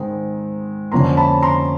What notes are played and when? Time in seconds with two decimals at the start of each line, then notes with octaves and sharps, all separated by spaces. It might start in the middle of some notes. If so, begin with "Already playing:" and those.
Already playing: G#2 D#3 G#3 C4
0.92 F2 D3 F3 A#3 C#4 A#5 C6
1.17 A5 B5
1.42 A#5 C6